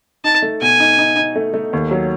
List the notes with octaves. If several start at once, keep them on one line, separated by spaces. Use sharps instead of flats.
D#4 A5
A3
B2 G#5
D#4
D#4
D#4
A3
A3
D#2
F#3